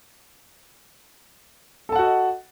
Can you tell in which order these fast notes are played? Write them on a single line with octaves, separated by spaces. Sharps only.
A4 A5 F#5 F#4 D#5